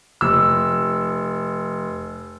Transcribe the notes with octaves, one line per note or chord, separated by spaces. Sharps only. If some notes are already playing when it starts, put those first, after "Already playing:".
F1 E6